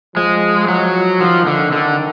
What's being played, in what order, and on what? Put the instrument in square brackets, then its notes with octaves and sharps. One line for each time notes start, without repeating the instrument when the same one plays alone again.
[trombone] F3 [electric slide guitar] G#3
[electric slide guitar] F#3
[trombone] D#3 [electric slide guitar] F3
[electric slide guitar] D3
D3